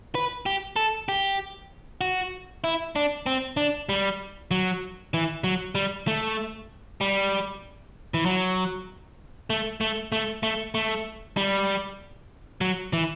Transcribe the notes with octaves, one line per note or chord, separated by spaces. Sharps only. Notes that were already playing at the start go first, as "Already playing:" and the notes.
B4
G4
A4
G4
F#4
E4
D4
C4
D4
G3
F#3
E3
F#3
G3
A3
G3
E3
F#3
A3
A3
A3
A3
A3
G3
F#3
E3